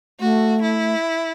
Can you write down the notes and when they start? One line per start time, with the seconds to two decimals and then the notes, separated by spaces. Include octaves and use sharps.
0.20 A3 F#4
0.62 E4